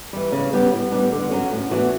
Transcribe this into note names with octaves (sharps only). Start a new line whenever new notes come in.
E3 G3
C#3
G3 B3 D4 G4
A2
G3 B3 D4
D3
F#3 C#4
A2
E3 B3 D4 F#4